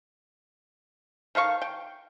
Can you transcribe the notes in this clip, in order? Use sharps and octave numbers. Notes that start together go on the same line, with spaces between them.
D#3 A4 F5 C#6
G5